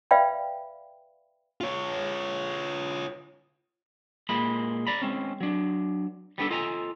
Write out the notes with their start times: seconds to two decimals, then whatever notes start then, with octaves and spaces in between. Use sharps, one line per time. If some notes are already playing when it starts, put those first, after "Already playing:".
0.11 B4 D5 E5 F5 G5 B5
1.61 F4 C#5
4.29 A#2 G#3 A#3 B5
4.87 D5 A#5 B5
5.02 G#3 C4 C#4
5.41 F#3 D4
6.38 G3 B3 D4 A4
6.50 F4 A4 D#5 G#5 A#5